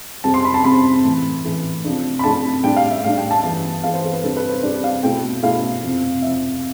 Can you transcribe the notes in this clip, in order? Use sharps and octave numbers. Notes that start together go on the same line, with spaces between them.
F2 C3 G3 C4 A5
C6
B5
A5
F2 C3 G3 C4 B5
A2 E3 A3
A2 E3 A3
C3 F3 A3 D4
B5
C3 F3 A3 D4 A5
A2 G3 D4 G5
F5
E5
A2 G3 D4 F5
G5
A5
G2 E3 B3 A5
G2 E3 B3 F5
C5
A4
B4
C3 G3 D4 A4
B4
C5
C3 G3 D4 D5
F5
B2 A3 E4 G5
B2 A3 E4 F5
F2 C3 F3
F2 C3 F3 E5